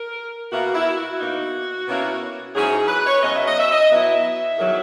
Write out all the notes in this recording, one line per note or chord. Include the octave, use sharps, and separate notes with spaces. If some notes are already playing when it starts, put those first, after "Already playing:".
Already playing: A#4
B2 A#3 E4 F#4
E4
F#4
B2 A#3 D#4
B2 A#3 C#4 E4
G#2 F#3 C#4 E4 G#4
G#4
B4
C#5
B2 F#3 C#4 D#5
E5
D#5
E5
D#5
B2 F#3 B3 E4 E5
E2 D#3 F#3